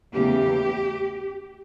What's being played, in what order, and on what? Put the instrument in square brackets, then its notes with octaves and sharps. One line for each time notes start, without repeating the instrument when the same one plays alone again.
[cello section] E2 C#3 E3 A3 G4